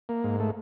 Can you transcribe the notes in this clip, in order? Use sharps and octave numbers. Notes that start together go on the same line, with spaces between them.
A#3
G#2
A3